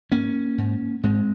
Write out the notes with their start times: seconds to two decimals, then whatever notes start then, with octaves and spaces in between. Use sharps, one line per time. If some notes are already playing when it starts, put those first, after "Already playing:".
0.11 G#2 A#3 C#4
0.58 G#2
1.04 G#2 G#3 C4